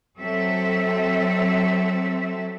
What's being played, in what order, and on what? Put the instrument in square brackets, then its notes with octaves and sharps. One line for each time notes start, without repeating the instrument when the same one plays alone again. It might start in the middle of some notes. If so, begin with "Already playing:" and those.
[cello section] F#3 C4 A4 E5